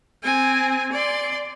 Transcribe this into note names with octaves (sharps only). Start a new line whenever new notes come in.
C4 G#5
D5 C6